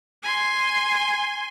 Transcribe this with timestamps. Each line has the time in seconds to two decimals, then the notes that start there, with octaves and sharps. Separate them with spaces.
0.23 G#5 C6